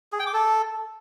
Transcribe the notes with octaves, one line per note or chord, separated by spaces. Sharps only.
G#4
G5
D6
A4